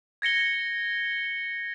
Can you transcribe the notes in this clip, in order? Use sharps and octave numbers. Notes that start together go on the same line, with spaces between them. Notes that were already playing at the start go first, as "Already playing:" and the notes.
G#6 A#6 C#7 G7